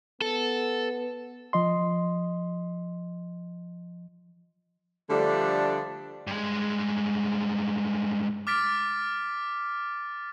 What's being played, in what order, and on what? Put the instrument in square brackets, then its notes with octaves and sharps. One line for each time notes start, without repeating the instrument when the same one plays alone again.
[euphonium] B3 [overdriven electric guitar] A4
[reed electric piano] F3 D#5 C6
[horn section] D3 F3 G3 A3 D4
[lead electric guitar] G2 G#3
[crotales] D6 F6 A6 B6 D7